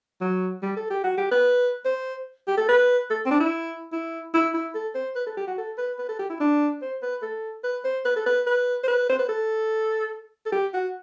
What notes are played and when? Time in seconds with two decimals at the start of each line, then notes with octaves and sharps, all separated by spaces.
0.21 F#3
0.63 G3
0.76 A4
0.90 G4
1.03 F#4
1.17 G4
1.31 B4
1.85 C5
2.47 G4
2.57 A4
2.69 B4
3.10 A4
3.26 C4
3.31 D4
3.40 E4
3.92 E4
4.34 E4
4.54 E4
4.74 A4
4.95 C5
5.16 B4
5.27 A4
5.37 G4
5.47 F#4
5.58 A4
5.78 B4
5.99 B4
6.09 A4
6.19 G4
6.30 E4
6.40 D4
6.82 C5
7.02 B4
7.22 A4
7.64 B4
7.84 C5
8.05 B4
8.16 A4
8.26 B4
8.47 B4
8.83 C5
8.88 B4
9.09 C5
9.19 B4
9.29 A4
10.46 A4
10.52 G4
10.73 F#4